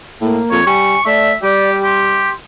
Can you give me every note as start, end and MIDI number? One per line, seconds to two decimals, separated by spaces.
0.21 0.39 45
0.21 0.60 58
0.51 0.64 41
0.51 0.64 73
0.67 0.96 55
0.67 1.01 80
0.67 1.02 85
1.06 1.34 57
1.06 1.32 74
1.06 1.35 76
1.43 2.29 55
1.43 1.78 67
1.43 1.71 74
1.83 2.29 67
1.83 2.35 84